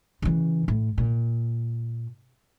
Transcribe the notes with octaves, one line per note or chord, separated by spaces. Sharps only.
C#3 E3
A2
A#2